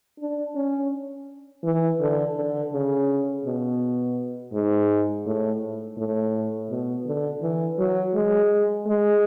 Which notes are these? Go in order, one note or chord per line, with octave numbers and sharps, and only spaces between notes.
D4
C#4
E3
D3
D3
C#3
B2
G#2
A2
A2
B2
D3
E3
F#3
G#3
G#3